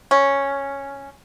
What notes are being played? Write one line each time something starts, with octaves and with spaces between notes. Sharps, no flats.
C#4